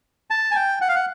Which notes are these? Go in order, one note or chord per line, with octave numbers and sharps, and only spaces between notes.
A5
G#5
G5
F#5
F5
F#5